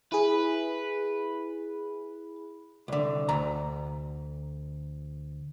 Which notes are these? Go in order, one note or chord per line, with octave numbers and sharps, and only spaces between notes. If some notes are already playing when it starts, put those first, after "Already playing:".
E4 G#4 B4
C2 D3
D2 A#5